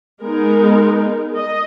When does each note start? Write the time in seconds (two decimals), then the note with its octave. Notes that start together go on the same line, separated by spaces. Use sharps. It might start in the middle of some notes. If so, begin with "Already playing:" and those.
0.22 G#3 B3 D#4 A#4
1.36 D#5